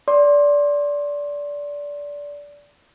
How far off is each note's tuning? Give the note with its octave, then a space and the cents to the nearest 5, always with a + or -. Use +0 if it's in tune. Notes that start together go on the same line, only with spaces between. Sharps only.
D5 -20 C6 +20